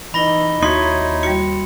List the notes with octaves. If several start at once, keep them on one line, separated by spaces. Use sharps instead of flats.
E3 D#4 B5 A#6 G7
D#2 D#4 E4 F#4 C#5 C6
G3 F#4 C#7